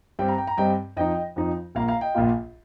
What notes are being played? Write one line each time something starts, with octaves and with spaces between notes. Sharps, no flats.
G2 G3 C4 G5
A#5
G5
A#5
G2 G3 C4 D#5 G5
F2 F3 D#4 D#5 G5
F2 F3 D#4
A#1 A#2 A#3 F4 F5 A#5
F5 A#5
D#5 G5
A#1 A#2 A#3 F4